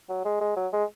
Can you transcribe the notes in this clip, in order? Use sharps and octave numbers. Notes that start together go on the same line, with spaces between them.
F#3
G#3
G#3
F#3
G#3